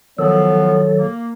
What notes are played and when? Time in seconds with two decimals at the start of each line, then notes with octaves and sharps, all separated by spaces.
0.19 D#3 F3 F#3 B3 A4 C#5
0.98 A#3